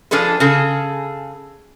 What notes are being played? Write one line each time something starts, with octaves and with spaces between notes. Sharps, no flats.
F3 D4 G#4 A4 B4
C#3 G#4 A4